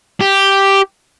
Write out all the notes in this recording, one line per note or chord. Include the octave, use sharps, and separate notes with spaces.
G4